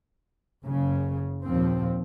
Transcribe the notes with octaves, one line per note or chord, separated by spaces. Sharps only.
F#1 C#3
D#2 A#2 F3 C4